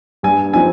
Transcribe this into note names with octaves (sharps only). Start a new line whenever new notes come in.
G2 G#5
F3 C4 D#4 G#5